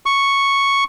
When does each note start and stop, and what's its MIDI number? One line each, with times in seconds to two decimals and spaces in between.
0.06 0.84 85